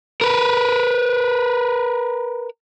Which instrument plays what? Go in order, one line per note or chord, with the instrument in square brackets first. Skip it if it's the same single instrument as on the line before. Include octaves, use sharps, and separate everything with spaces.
[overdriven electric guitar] A#4 B4